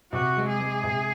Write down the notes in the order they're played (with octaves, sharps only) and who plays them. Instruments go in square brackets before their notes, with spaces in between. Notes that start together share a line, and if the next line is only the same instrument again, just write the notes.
[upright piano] C3 [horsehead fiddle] F#4
[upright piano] G#3
[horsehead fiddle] G#4
[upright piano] G#3
C3